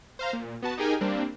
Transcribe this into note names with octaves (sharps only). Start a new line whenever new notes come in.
C5 F5 A#5
A#2
B3 F#4 A5
D#4 G4 G#4 A#4 G5 G#5
G3 A#3 C4 D4